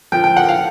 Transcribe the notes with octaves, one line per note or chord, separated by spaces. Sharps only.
F3 G5
G5
F3 F#5
F5